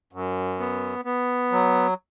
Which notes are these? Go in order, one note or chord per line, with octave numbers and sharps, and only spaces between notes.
F#2
B3
B3
F#3